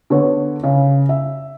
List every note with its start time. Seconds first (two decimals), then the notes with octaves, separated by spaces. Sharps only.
0.10 D3 B3 C#5
0.63 C#3
1.09 E5